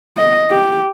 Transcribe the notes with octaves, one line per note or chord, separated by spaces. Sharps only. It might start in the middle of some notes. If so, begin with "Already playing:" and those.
D#5
G4